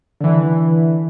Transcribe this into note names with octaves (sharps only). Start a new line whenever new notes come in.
D3 E3